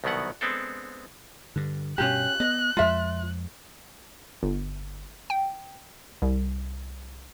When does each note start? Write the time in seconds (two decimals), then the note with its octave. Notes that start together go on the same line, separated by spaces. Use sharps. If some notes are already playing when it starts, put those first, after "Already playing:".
0.04 C2 B2 D#3 F#3 B3 F#5
0.41 G#3 B3 C4 D4 A4
1.56 G2 D3
1.98 G2 B2 C#4 F4 G4 F#6
2.40 B3 D#5
2.77 F2 G#3 F4 E5
4.43 G1
5.30 G5
6.22 C2